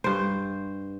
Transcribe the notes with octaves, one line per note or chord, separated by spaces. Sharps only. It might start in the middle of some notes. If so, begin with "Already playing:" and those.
G2 C5